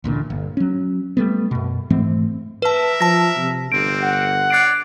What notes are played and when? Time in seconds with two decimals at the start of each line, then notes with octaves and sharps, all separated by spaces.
0.04 D1 A1 A#2 D3
0.30 G1
0.57 F#3 C#4
1.17 G3 A3 B3
1.51 F#2 B2
1.90 G#2 E3 A3 C4
2.62 A#4 B4 E5 A5
3.01 F3 A5 A#6
3.37 C3
3.72 G1 A#3 C4 D7
4.02 F#5
4.50 C#5 D5 F#6 C7 D7